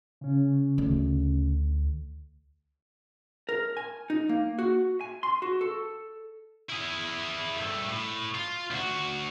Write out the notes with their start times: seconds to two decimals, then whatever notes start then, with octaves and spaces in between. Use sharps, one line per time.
0.21 C#3 C#4
0.78 D2
3.49 A#4
3.77 G#5
4.10 D#4
4.29 A#3
4.59 F#4
5.01 G#5
5.23 C6
5.42 F#4
5.61 A4
6.70 E4 G#4
7.57 G2 A3
7.88 A2
8.35 F4
8.71 D2 F#4